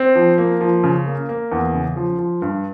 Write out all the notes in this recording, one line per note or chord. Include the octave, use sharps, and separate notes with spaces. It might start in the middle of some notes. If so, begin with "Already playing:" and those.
Already playing: C4
F3
A#3
F3
C#3
A#3
A#3
E2
C#3
F3
F3
G2